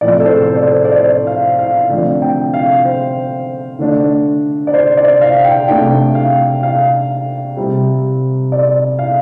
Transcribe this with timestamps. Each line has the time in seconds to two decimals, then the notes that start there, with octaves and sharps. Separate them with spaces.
0.01 A2 F3 C4 D5
0.20 A4
0.25 C5
0.49 C5
0.56 D5
0.63 C5
0.72 A4
0.85 D5
0.96 C5
1.27 F5
1.59 F5
1.90 D3 F3 A3 C4 D5
2.22 G5
2.54 F5
2.85 C5
3.79 D3 A3 D4
4.67 D5
4.74 C5
4.97 D5
5.21 F5
5.44 G5
5.68 C3 A3 D4 G5
6.15 F5
6.63 F5
7.56 C3 G3 C4
8.52 D5
8.99 F5